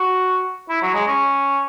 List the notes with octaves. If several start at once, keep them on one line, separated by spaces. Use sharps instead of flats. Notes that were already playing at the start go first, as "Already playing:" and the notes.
Already playing: F#4
E4
F#3
G#3
C#4